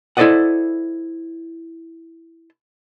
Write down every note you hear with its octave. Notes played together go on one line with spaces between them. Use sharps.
E4 A4 C5 D5 D#5 F#5